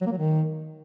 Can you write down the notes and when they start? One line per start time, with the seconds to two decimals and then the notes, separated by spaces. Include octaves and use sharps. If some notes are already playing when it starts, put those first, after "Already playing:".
0.01 F#3
0.07 A#3
0.12 F#3
0.17 D#3